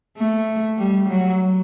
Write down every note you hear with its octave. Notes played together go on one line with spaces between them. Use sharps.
A3
G3
F#3